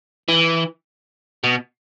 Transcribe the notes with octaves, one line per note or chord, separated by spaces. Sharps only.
E3
B2